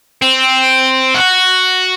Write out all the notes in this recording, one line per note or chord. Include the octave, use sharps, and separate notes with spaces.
C4
F#4